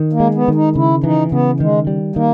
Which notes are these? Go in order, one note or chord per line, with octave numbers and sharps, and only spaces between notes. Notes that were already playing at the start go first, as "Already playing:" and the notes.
Already playing: D#3
A#3
G#3
B3
D#3
D#4
C#3 E4
E3 D#4
C#3 B3
D#3 G#3
G3
D#3 A#3